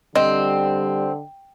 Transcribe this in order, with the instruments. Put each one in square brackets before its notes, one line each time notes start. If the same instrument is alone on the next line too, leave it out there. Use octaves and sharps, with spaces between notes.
[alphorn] D3 [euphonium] G3 [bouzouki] C4 [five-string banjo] D#5